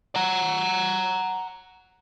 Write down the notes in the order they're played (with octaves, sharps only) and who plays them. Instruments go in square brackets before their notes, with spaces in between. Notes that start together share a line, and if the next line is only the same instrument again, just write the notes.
[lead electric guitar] F#5 A#5